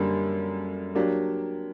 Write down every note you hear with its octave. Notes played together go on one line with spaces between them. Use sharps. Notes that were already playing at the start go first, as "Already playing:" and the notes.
Already playing: F#2 D3 G3 A#3
F#3 A#3 D4 G4